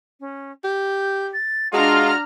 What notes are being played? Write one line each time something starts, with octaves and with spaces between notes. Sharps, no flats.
C#4
G4 G6
A6
G#3 D4 F4 F#4 A#5 F6